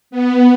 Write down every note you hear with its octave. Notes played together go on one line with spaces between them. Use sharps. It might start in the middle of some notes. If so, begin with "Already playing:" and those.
B3